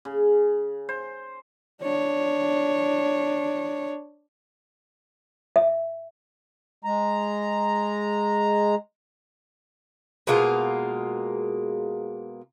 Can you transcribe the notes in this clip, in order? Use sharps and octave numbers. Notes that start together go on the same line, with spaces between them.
C#3
C5
D4 C#5
E5
G#3 A#5
B2 G#3 A#3 F4